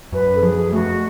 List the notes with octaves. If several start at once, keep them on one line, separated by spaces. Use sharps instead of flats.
F#2 B4
A4
F3 G#4
A3 F#4